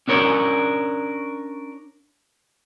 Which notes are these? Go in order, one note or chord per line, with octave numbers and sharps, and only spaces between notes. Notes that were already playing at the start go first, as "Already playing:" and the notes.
C#4 D4 A#4 C#5